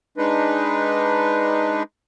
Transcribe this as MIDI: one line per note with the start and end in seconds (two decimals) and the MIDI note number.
0.17 1.83 56
0.17 1.83 62
0.17 1.83 63
0.17 1.83 71